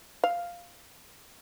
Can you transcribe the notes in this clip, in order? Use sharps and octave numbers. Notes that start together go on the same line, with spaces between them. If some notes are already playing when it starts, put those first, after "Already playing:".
F5